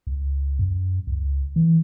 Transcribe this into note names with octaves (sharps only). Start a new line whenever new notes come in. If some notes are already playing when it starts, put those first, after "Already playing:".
C#2
F#2
C#2
E3